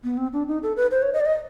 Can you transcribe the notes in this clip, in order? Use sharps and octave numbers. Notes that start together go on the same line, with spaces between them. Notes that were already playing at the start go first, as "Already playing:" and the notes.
B3
C4
D4
D#4
A4
B4
C5
C#5
D#5
D5
D#5